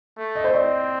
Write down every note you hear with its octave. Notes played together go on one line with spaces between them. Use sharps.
A3
D#5
C5
C4 D5